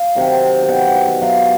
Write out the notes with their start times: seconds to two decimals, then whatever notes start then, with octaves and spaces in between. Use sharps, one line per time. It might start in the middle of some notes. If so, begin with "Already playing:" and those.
Already playing: F5
0.15 C3 D#3 F#3
0.63 G5
0.68 B2 F#3 F#5
0.82 G5
0.95 F#5
1.08 E5
1.22 B2 F#3 F5